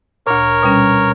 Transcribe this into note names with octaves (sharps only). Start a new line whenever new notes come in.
D2 A#2 A#4 C#5
B2 G3 C#4